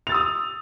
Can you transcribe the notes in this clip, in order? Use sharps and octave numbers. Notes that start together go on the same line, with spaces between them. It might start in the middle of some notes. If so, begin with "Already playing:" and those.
D#6 E6 A6 F7